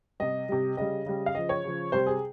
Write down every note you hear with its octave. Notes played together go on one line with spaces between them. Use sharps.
C3 G3 D#5
C3 G3
C#3 G3 D#5
C#3 G3
F5
C#3 F3 D#5
C#5
C#3 F3
C3 G3 C5
G#4